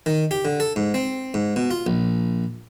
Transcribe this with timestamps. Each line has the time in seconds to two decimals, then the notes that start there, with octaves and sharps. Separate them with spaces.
0.06 D#3
0.31 G4
0.45 D3
0.60 A4
0.76 G#2
0.94 C4
1.34 G#2
1.56 B2
1.71 F4
1.87 A#1